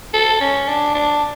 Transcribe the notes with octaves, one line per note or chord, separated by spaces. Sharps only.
A4
C#4
D4
D4